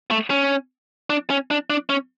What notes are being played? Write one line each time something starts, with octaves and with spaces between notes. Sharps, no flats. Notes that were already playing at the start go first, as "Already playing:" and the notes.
A3
C#4
D4
C#4
D4
D4
C#4